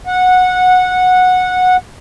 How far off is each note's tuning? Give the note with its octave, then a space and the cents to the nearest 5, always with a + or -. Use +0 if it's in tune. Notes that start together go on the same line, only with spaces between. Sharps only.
F#5 -15